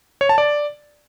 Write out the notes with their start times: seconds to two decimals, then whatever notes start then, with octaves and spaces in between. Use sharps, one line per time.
0.21 C#5
0.29 A5
0.38 D5